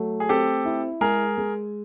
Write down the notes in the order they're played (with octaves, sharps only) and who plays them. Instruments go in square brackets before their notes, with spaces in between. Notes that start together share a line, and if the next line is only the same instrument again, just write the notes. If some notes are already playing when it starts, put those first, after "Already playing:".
Already playing: [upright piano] F#3 A3
[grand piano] G#4
[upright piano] C4 [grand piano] G4 A4
[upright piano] E4
[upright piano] G#3 [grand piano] G#4 A#4
[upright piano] G#3